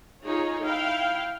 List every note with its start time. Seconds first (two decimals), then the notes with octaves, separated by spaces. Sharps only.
0.23 D#4 F4 G#4 C#5
0.63 E4 F5 G5